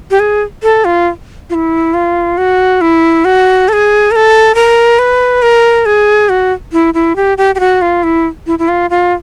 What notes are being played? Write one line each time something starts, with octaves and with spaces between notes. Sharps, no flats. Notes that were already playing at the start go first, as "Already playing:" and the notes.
G4
G#4
A4
F4
F4
E4
F4
F#4
E4
F#4
A4
G#4
A#4
A4
A#4
B4
A#4
G#4
F#4
E4
E4
G4
G4
G4
F#4
F4
E4
E4
E4
F4
F4